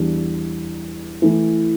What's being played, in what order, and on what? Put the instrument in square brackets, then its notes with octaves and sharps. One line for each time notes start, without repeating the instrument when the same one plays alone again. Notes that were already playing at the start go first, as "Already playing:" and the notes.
Already playing: [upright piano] E2 E3 G3 D4 G4
E3 A3 E4